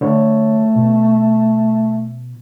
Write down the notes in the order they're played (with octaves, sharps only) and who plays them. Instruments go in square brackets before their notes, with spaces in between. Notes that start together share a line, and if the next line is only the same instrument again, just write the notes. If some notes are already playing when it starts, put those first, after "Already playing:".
[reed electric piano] D3 C#5 [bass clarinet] A3
[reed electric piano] B2